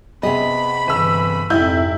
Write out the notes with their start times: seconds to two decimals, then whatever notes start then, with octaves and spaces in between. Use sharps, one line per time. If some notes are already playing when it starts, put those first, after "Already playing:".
0.23 C3 B3 G#4 D#5 B5
0.88 G1 E3 E6
1.50 F2 G#2 C3 E4 G6